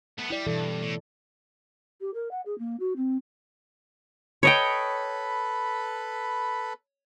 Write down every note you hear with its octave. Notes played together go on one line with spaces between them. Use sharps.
A3 B3
G3 E4 D5
G2 B2 E3 A4
A2
G4
A#4
F#5
G#4
A#3
F#4
C4
A4 B4 C#5 D#5 G5 B5